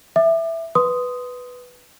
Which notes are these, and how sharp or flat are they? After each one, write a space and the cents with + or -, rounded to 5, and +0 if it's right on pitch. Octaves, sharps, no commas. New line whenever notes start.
E5 +0 D6 +35
B4 +0 C6 -15 D#6 +0